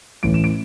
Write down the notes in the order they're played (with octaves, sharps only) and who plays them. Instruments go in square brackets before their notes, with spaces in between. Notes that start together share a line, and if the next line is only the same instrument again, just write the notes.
[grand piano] A1 A2 E3 D7
E7
D7